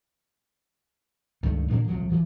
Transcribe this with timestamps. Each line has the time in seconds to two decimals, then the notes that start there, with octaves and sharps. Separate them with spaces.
1.43 C#2 G2 D#3 A3
1.70 A2 D3 A#3 D4
1.88 D#1 C2 C#3 F3
2.08 D2 E3